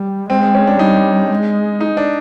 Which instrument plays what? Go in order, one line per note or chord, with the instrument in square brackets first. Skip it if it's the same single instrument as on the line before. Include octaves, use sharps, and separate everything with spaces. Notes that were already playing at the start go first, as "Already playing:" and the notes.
Already playing: [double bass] G3
[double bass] G#3 [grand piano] C4
[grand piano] C4
C#4
D4
[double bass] G3 [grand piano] D#4
[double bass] G#3
[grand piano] D#4
D4